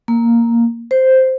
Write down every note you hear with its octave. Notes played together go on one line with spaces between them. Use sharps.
A#3
C5